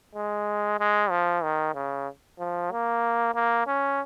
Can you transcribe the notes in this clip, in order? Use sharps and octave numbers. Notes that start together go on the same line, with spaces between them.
G#3
G#3
F3
D#3
C#3
F3
A#3
A#3
C#4